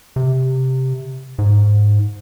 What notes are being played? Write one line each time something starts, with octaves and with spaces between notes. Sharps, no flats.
C3
G#2